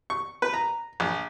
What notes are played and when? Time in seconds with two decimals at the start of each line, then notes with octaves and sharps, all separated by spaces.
0.10 C#6
0.42 B4
0.54 A#5
1.00 A#1